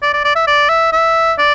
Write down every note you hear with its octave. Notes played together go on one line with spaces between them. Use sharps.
D5
D5
D5
E5
D5
E5
E5
D5